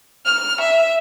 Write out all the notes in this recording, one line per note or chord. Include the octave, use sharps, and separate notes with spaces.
F6
E5